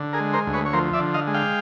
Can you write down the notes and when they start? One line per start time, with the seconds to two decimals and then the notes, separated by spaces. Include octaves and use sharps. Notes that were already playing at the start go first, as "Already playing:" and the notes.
Already playing: D3
0.13 G#4 A#4
0.20 G#3
0.33 A#4 C5
0.47 D2
0.53 B4 C#5
0.66 C#5
0.73 F3 A#4 C5
0.93 D5 E5
1.00 D3
1.14 D#5 F5
1.27 G#3
1.34 F5 G5